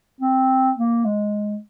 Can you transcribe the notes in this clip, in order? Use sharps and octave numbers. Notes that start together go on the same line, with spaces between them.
C4
A#3
G#3